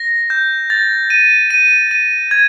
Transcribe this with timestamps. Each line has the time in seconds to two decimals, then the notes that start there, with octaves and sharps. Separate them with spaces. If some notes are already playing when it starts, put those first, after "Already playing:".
Already playing: A#6
0.30 G6
0.70 A6
1.10 D#7
1.50 D#7
1.91 D#7
2.31 G#6